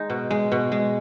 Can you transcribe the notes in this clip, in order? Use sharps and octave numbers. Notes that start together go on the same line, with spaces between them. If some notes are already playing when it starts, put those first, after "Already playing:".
Already playing: G#3 D#4
B2
G#3
B2
G#3